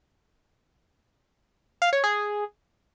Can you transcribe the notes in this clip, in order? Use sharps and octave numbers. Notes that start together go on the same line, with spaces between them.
F5
C#5
G#4